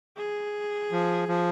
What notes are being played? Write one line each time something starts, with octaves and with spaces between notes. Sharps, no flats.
G#4
F3
F3